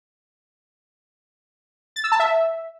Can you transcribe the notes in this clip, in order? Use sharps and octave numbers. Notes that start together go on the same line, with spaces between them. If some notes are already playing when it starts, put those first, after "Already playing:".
A6
E6
A5
E5